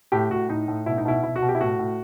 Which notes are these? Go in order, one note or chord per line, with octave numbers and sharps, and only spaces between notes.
A2 G4
A2 F#4
A2 D#4
A2
B2 E4
D#4
B2 E4
B2 E4
F#4
B2
G4
E4
A2 F#4
A2